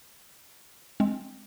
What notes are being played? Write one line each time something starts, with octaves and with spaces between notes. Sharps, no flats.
G#3 C4